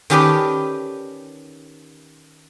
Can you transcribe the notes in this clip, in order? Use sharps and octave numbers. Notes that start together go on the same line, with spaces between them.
D#3 C#4 G4 A4 B4 D5